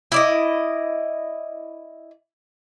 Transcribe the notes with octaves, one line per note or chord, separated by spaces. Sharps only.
E4 D5 D#5